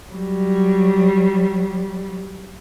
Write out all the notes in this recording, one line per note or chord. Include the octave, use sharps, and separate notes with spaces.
F#3 G3